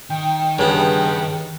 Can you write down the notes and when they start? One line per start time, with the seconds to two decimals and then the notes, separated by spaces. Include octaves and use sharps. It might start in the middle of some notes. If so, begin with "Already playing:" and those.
0.10 D#3 G5
0.59 G2 C#3 B3